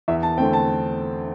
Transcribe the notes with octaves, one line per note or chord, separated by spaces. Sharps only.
E2 E5
A5
D3 A3 C4 G5
A5